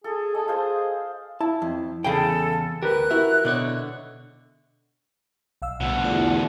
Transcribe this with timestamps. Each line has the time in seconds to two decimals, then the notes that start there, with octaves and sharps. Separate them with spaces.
0.04 G#4 A4
0.35 A4 D#5 G#5
0.48 G#4 A4 C5 F5
1.41 E4 A5
1.62 F2
2.04 E2 C#3 G#4 A4 F5 G5 G#5 B5
2.83 D2 G4 A#4 B4 F#6
3.11 E4 F#4 A#4 E5
3.45 B2 D3 C#5 D5
5.62 B1 F5 E6
5.81 D2 B2 F#5
6.04 E2 A3 F4 D5